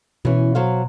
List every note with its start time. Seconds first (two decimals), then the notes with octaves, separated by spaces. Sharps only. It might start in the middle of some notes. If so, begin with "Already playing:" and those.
0.25 B2 E3 C#4
0.55 F#3 C5 F5